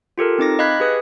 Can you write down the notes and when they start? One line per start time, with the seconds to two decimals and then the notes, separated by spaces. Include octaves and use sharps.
0.18 F4 G4 A4 A#4
0.38 C4 D#4 D6 A#6
0.59 D#5 F5 B5 F#6 G#6 B6
0.80 G4 G#4 B4 D#6